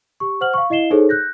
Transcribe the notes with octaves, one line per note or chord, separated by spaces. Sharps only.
G4 C#6
C5 F#5 F6 F#7
F5 C#6
E4 D#5 F5 C7 E7 G7
D#4 G#4 A4 C5 C#5
F#6 G6 A#6